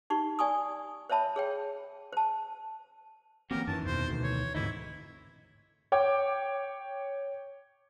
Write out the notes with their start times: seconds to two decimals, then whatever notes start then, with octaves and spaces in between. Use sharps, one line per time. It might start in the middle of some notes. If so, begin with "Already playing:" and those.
0.10 D#4 G4 C#6
0.39 D5 G#5 C#6 D#6
1.09 C5 C#5 E5 A5 B5
1.36 G#4 C#5 G5
2.13 C5 A5
3.51 E3 F#3 A#3 C4 C#4 G4 A#4
3.67 F#2 D#3 E3 A5
3.86 E2 B2 C5
4.08 D2 B2
4.23 C#5
4.55 D2 G#2 C3 E3 D#4 E4
5.92 C#5 G5 D6